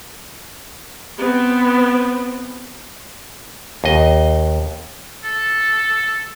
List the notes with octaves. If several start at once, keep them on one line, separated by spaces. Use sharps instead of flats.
B3 C4
D#2 D#5
A4